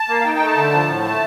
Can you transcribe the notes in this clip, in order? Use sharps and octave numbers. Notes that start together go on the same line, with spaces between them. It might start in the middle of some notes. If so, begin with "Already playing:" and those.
Already playing: A5
A#3
F5
D#4 G5
G5
A3
A5
D3
F3
A2
A3